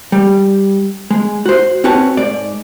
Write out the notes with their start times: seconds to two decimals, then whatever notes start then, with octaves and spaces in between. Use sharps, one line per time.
0.12 G3
1.11 G#3
1.46 F#4 C5
1.84 C4 C#4 F#4 B4 C#5 A5
2.17 G#2 D5